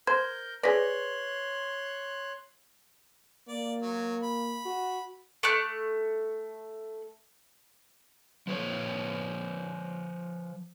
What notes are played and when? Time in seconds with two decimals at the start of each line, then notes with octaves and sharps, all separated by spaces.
0.07 A#4 C5 G6 G#6
0.63 G#4 B4 C#5 D5 C6 F#6 A#6 B6
3.49 A#3 D5
3.82 F#3
4.23 B5
4.65 F#4
5.43 A3 D6 F#6
8.47 F3 B4 C#5